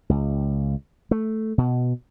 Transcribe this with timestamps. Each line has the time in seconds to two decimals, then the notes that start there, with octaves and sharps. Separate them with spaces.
0.09 C#2
1.11 A3
1.58 B2